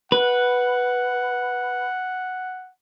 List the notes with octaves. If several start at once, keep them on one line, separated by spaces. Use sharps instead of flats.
B4 F#5